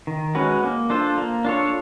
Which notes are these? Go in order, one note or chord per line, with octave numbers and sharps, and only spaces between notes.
D#3
G#3 C#4 F#4 B4
A#3
D4 F4 A4 C5
A#3
D4 F4 A4 C#5